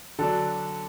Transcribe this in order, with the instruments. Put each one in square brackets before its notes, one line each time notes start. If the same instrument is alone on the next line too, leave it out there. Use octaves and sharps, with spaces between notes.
[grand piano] D3 F#3 D4 A4